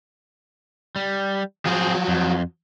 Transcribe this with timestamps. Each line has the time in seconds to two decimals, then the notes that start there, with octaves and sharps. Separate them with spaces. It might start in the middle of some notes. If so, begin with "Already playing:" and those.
0.96 G3
1.66 F3 F#3 C4 G#4
2.08 F2